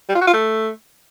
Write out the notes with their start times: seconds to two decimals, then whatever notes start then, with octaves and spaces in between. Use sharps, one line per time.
0.09 G3
0.15 F4
0.21 F#4
0.27 F4
0.33 A3